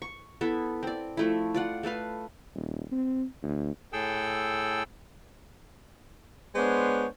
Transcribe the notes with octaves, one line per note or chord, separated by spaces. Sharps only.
C#6
B3 E4 A4 E5
C4 D5
F3 A3 E4
F4 D5 F#5
A3 A4 B4 F5
D#1
C4
D2
A2 G#4 A4 G5 E6
G#3 B3 D4 C5 C#5